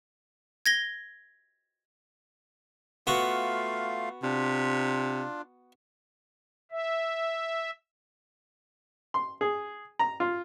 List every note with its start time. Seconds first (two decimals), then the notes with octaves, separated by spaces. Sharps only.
0.66 G#6 A#6 G7
3.07 A3 B3 F4 F#4 F5
4.23 C3 D4 F4
6.72 E5
9.14 C6
9.41 G#4
9.99 A#5
10.20 F4